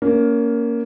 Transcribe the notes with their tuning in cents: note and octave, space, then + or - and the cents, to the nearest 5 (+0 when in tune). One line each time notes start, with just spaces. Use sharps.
A#3 +0 C#4 +20